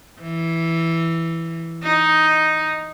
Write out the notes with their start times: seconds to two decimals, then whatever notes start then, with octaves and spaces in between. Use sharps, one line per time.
0.21 E3
1.82 D#4